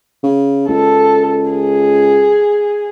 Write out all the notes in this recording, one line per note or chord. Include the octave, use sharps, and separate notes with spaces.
C#3
C#2 A4
G#4